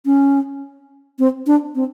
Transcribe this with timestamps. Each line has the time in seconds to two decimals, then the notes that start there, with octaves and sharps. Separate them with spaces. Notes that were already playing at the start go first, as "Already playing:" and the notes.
0.06 C#4
1.19 C4
1.47 D4
1.75 C4